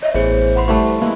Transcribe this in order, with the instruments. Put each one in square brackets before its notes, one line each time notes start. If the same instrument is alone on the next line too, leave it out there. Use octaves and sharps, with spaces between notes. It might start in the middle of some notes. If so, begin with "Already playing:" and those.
[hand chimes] C#5 E5 [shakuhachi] D#5
[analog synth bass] A1 [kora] E3 [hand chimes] B3 G#4 [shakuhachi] C5
[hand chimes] F#5 B5 C6
[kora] E3 G3 A3 [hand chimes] A5 C#6
[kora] E3 G#3 E4 [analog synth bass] A#3